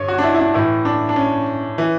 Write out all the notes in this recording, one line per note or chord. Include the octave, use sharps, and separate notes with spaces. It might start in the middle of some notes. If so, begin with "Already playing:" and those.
Already playing: G2 D3 C#5
F#4
D4
E4
E4
D4
A2 E3 E4
D4
D4
C#4
E3